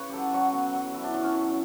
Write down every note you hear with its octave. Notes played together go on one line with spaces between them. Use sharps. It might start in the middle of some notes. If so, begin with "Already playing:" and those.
Already playing: C#3 B4 C#5
F#3 G4 A4
F#3 F#4
B2
F#3
F#3 E4
D4
F#3 D4
C#4
F#2